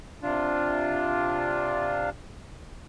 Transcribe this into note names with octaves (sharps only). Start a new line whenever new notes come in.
C3 D4 F4